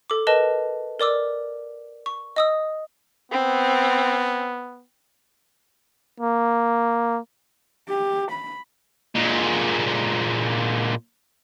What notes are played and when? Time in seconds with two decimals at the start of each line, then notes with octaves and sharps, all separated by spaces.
0.10 A4 D6
0.27 A#4 B4 D#5 A5
1.00 A#4 D5 D6 E6
2.06 C#6
2.36 D#5 D#6 E6
3.32 B3 C4
6.20 A#3
7.89 G4
8.31 B5
9.15 A#2 G#3